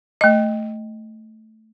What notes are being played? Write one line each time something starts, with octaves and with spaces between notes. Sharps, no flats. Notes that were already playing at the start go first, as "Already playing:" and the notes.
A3 D#5